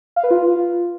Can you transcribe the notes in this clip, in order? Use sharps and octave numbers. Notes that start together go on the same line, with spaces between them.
F5
B4
F4